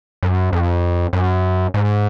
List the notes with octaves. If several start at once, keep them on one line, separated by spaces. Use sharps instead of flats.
F#2
F2
F#2
G#2